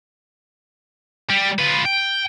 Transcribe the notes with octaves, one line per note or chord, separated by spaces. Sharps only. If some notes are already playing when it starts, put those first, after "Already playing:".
G3 G4
F4 B4
G5